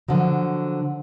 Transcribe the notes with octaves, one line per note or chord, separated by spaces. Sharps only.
D3 F3 F#3